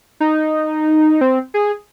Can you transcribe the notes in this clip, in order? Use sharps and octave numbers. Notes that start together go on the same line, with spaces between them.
D#4
C4
G#4